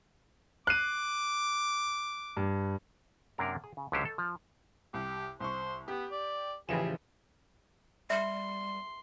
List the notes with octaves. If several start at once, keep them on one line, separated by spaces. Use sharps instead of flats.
D6 F#6 C7 D#7
G2
F#2 C3 A#3 D4 A#4
G#4
C#3
C#2 D3 F#3 C#4 G4 C5
A4
F3
C2 G4
C2 C5 C#6
B3 G4
D5
A1 C#3 E3 F3 G4 G#4 E7
G3 E5 C6